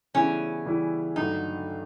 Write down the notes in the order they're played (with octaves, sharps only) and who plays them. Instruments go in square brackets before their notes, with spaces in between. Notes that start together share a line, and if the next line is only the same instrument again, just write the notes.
[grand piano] C#3 E3 G3 B3 E4 [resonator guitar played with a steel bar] C#4
[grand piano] C#3 E3 G3 B3 E4
[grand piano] G2 D3 F#3 A3 [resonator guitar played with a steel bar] D#4